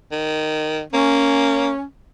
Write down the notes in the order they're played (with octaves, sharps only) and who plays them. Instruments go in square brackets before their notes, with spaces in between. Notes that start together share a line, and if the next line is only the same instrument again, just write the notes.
[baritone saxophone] D#3
[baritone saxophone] A#3 [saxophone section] C#4